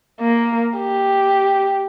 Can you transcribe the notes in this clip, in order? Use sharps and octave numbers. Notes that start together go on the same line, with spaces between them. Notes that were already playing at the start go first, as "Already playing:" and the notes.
A#3
G4